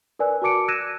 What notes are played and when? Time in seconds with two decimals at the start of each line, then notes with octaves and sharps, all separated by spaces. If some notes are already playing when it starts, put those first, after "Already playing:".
0.19 A#4 B4 D5 G#5 E6 F#6
0.42 F#4 A#4 A5 D6 C#7 D7
0.68 E6 F#6 G#6 A#6 D#7 E7